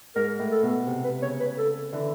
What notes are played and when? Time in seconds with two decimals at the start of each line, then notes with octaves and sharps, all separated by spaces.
0.16 G#2 A#4
0.39 A2
0.51 A4
0.63 B2
0.87 C3
1.04 B4
1.22 C#3 C#5
1.40 B4
1.58 A4
1.93 D3 E3 A4